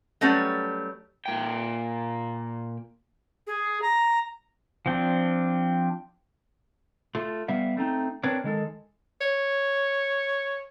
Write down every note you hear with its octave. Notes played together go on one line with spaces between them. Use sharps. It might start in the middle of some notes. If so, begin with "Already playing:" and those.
F#3 G3 A3 C#4 B4
A#2 G5
G#4
A#5
F3 C4 D4
A3 F4
G3 B3 E5 F5
A3 C4 D#4
C4 D4 A#4 B4 C#5
D#3 G#3 A4
C#5